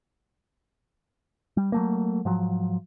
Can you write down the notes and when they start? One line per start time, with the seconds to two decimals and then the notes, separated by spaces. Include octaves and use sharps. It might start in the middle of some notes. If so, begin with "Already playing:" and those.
1.57 G3
1.72 F#3 A3 A#3
2.25 G#2 F3 F#3